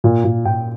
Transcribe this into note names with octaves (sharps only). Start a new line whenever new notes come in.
A#2
A#2
A#2 G5